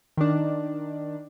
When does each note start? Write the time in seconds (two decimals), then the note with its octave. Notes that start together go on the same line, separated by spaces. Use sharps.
0.17 D#3 D4